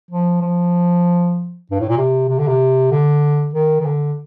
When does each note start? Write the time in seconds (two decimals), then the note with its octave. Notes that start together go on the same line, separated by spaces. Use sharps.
0.10 F3
0.41 F3
1.71 G2
1.80 A2
1.89 A#2
1.98 C3
2.29 C3
2.39 D3
2.48 C3
2.91 D3
3.54 D#3
3.80 D#3
3.85 D3